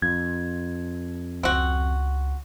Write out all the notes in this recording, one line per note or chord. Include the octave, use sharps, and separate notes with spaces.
F2 G#6
C#2 C4 F#4